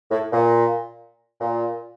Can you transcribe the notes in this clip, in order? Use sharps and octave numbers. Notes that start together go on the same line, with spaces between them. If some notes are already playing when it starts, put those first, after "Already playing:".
A2
A#2
A#2